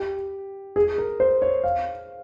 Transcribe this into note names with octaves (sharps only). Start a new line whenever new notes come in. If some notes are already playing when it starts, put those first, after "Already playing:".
Already playing: G4
G#4
A#4
C5
C#5
F5